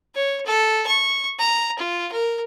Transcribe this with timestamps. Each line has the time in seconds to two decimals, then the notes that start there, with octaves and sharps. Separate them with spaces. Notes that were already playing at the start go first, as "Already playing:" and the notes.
0.15 C#5
0.46 A4
0.87 C#6
1.39 A#5
1.79 F4
2.12 A#4